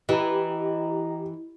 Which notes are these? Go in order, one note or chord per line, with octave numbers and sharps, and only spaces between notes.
E3 G4 D#5 A#5